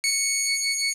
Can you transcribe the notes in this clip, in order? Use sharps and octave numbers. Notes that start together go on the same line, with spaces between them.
C#7